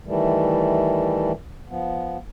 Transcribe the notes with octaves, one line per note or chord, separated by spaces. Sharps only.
D#3 E3 G3 A3
F3 B3